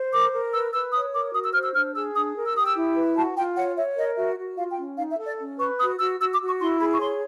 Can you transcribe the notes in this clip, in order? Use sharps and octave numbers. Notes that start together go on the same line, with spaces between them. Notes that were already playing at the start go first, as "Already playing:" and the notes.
Already playing: C5
A#4 D6
A#4
B4 E6
B4 E6
C#5 D#6
A#4 D6
F#4 D#6
E6
C5 F6
E6
D4 F6
G#4 E6
D4 D#6
A#4
E6
G4 D#6
E6
E4
B4
F#4 A5
F4 G5
C#5 F#5
C#5 E5
A#4 D#5
F#4 E5
F#4
F4 F5
G5
C#4
D#4 F5
E5
A4
D5
C#4
B4 C#6
F#4 D#6
F#4 E6
F#4 E6
D6
F#4
C#6
E4 C6
G#4 B5
C#6
C#5 C6